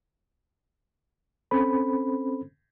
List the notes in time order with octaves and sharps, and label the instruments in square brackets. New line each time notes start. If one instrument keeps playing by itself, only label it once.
[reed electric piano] C4 C#4 A4 C5 B5